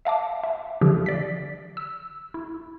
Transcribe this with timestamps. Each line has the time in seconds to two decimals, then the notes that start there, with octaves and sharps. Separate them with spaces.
0.05 E5 F5 A5 D6
0.44 E5
0.81 D3 F3 G4
1.06 D5 B6
1.77 E6
2.34 E4